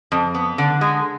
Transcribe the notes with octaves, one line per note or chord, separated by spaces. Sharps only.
F2
B3
D3
G#3